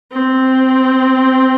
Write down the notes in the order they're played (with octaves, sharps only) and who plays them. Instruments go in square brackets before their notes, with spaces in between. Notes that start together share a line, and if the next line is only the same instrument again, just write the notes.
[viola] C4